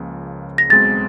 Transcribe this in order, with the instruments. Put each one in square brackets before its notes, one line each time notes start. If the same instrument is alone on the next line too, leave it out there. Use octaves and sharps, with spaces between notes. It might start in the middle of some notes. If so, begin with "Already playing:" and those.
Already playing: [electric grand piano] C#2 C#3 F3 A#3
[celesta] A#6
[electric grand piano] B1 B2 G#3 C4 [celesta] A6